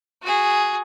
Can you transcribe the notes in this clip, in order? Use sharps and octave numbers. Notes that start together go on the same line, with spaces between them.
F#4 G#4